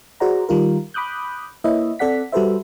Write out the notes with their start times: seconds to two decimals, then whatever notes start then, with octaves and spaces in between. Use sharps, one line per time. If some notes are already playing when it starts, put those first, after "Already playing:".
0.20 F#4 G#4 C5 D5 F#5 A#5
0.49 D#3 G3 F4 A#4
0.94 B5 D6 D#6 F#6 G6
1.64 A#3 E4 B4 C#5 D#5 E5
1.99 C4 A4 D5 F#5 B6
2.32 G3 F#4 A4 B4 C5 E5